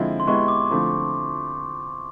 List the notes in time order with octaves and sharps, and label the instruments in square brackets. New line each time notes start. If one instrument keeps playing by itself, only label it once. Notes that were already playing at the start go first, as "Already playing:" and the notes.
Already playing: [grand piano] D3 F3 G#3 C4 E4
[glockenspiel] C6
[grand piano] G#3 B3 E4 G4 [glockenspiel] C#6
[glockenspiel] D6
[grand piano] D3 F3 A3 C4 E4